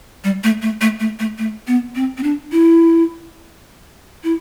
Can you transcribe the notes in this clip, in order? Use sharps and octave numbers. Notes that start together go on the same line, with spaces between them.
G3
A3
A3
A3
A3
A3
A3
B3
C4
C4
D4
E4
E4